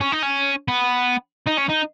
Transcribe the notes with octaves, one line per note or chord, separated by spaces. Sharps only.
C#4
D#4
C#4
B3
D#4
C#4
D#4